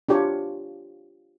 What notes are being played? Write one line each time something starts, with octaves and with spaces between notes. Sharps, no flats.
D4 F4 G4 C#5